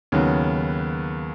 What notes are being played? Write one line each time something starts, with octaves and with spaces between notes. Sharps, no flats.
D#2 C#3 F#3 B3